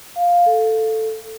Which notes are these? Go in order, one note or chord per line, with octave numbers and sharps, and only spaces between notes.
F5
A4